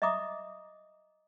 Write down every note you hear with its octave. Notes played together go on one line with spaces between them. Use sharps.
D#5 E5 A#5 D6 D#6